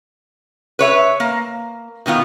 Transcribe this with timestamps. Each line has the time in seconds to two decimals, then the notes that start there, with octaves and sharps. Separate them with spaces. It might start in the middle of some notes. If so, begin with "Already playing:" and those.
0.79 B4 C#5 E5
1.20 A#3
2.06 B2 D#3 B3 F4